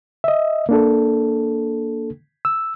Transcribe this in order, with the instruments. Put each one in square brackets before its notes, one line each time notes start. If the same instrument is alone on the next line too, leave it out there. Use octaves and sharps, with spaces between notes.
[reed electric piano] D#5 E5
A#3 D4 A4
E6